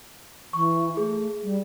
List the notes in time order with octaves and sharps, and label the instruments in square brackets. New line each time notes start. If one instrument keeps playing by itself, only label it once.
[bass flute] E3 [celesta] C#6
[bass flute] A3 [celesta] G#4
[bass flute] G3